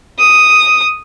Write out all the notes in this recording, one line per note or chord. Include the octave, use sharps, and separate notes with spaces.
D#6